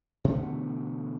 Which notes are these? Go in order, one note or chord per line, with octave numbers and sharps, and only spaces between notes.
B2 D3 E3 A3